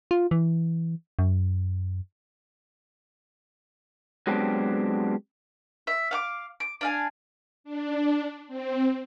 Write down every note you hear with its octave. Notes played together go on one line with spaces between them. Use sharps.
F4
E3
F#2
F#3 G#3 B3 C4 D4 G4
E5
F5 F#5 D6
D6
D4 F5 G#5
D4
C4